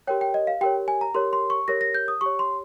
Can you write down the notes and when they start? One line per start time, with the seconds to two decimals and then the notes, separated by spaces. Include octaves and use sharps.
0.07 G4 A#4 C#5 G5
0.21 G5
0.34 D#5
0.47 F5
0.61 G4 A#4 C#5 G5
0.88 G#5
1.01 A#5
1.14 G4 A#4 C#5 C6
1.33 C6
1.50 C#6
1.68 G4 A#4 C#5 A#6
1.81 A#6
1.94 G6
2.08 D#6
2.21 G4 C#5 C#6
2.39 C6